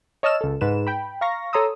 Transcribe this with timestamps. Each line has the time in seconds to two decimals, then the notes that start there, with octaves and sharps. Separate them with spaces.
0.23 C#5 D#5 A5 E6 F6 E7
0.41 C#2 A4
0.61 G#2 B4 E7
0.87 G5 B5
1.21 F5 A#5 C#6 A#6
1.53 A4 C#5 A#5 C6 D#6 E6